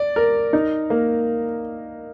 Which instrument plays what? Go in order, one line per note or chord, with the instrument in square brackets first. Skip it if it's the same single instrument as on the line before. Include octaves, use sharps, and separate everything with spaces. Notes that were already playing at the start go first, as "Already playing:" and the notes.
Already playing: [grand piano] D5
A#4
D#4
A#3